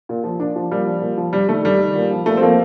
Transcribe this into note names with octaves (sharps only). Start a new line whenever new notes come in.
A#2
F3
A#2 D4
F3
A#2 G3
F3
A#2
F3
G2 G3
D#3 A3
G2 G3
D#3
A#2
F3
A#2 A3
C4
F3 A#3